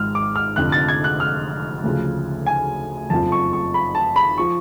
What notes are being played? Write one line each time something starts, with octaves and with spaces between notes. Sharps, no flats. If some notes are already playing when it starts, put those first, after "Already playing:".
Already playing: G#1 G#2 F3 F6
D6
F6
F1 F2 D3 F3 F#6
A6
G#6
F#6
F6
D2 C#3 F3
G#5
F#1 F2 F3 A5
C#6
C#6
B5
A5
B5
F3 C#6